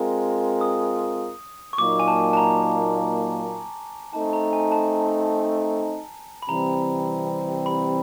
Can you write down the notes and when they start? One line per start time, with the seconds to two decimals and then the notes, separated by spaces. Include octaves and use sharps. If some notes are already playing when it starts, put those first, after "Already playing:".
Already playing: G#3 C4 F4 A#4
0.61 D#6
1.73 C#6
1.78 A#2 F#3 A#3 D#4 D6
1.99 G#5
2.08 A5
2.33 A5
2.37 A#5
4.13 A3 C4 D#4 A5
4.33 A#5
4.53 G#5
4.72 A5
6.42 B5
6.48 C3 E3 G3 C4 A#5
7.66 B5